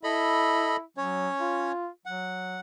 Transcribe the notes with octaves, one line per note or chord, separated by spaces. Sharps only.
E4 A4 D#5 B5
F#3 C#4 C#5
F4
F#3 F#5